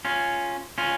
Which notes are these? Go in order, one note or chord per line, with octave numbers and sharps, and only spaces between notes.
C#4 F4
C#4 F4